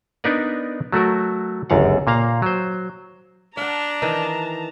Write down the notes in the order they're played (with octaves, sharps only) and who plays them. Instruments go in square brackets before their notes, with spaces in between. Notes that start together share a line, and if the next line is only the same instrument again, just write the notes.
[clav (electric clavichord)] B3 D4 D#4 A#4 B4 D5
F#3 A3 F#4 A#4
G1 C#2 F#2 F5 F#5
A#2 A#3 F5 A#5
F#3 C5
[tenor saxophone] D4 [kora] F5 F#5 [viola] A5 A#5
[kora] D#3 E3 D#4